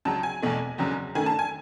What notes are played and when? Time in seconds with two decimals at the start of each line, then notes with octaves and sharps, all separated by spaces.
0.05 C#2 C#3 F#3 A5
0.23 G#5
0.42 E2 B2 A3
0.78 F#1 E2 C#3 F#3
1.15 F#2 D#3 A3 G#5
1.26 A5
1.39 G#5